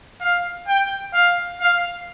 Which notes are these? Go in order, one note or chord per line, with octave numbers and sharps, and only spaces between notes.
F5
G5
F5
F5